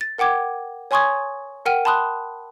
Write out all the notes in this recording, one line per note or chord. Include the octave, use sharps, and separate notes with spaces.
A6
A#4 F#5 G5 D6 G#6
C#5 G#5 C6 C#6 D#6 G#6
A#4 F#5 G5 F6 D#7
A5 B5 C6 D#6 F#6